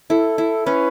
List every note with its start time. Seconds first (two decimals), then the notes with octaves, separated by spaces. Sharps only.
0.10 E4 A4
0.38 E4
0.66 C#4 B4